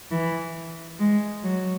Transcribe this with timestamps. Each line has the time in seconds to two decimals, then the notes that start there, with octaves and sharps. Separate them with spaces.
0.11 E3
1.00 G#3
1.44 F#3